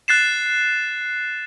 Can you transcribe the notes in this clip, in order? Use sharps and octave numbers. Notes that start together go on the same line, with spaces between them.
F#6 A6 C7 E7